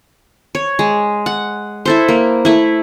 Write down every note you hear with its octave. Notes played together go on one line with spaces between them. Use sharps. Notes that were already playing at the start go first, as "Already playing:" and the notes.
C#5
G#3
F#5
E4 A4 C5
A#3
A3 E4